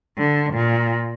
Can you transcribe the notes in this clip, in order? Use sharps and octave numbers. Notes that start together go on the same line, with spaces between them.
D3
A#2